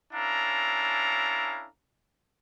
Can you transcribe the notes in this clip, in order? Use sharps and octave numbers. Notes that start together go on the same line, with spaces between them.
C#4 D4 E4 A4 F5 A#5